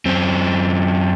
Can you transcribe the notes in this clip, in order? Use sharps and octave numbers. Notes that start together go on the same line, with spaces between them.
F#2 C4